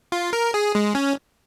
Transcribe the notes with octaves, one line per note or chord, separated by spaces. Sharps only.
F4
A#4
G#4
G#3
C#4